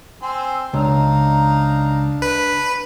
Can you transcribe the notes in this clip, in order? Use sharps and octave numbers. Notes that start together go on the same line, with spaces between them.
C4 G#5 C6 E6
C#2 D4 D#4 F5 A#5
B4